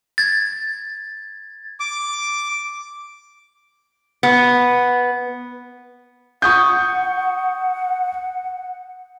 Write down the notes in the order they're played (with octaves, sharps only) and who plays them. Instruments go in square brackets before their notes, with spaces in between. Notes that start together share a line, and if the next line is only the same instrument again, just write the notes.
[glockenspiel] G#6 A6
[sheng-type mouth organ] D6
[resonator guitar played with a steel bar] B3
[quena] F#5 [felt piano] C#6 D#6 G6